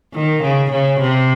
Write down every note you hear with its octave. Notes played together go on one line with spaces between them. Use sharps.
D#3
C#3
C#3
C3